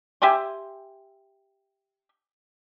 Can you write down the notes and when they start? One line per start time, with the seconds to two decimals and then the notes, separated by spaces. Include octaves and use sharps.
0.22 G4 E5 G#5 C6